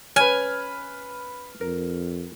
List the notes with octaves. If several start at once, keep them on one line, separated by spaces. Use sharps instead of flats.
C#4 B4 G#5 F6
F2 A#4